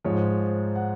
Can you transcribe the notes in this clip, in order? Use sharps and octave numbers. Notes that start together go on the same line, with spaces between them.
G#2 F3 G#3 C#5
F#5